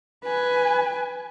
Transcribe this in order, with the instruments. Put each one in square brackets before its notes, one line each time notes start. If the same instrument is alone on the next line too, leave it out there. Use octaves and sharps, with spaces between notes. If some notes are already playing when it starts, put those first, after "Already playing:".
[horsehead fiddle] B4 G#5